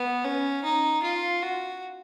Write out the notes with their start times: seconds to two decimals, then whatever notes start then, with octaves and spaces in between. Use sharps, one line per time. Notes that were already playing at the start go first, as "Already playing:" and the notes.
Already playing: B3
0.25 C#4
0.64 D#4
1.03 F4
1.42 F#4